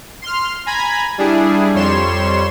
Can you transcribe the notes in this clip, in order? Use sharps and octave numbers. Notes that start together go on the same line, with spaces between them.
C6 F6
G#5 A#5 B5 G#6
G3 D4 E4 G#4
F2 G3 C#5 C6 E7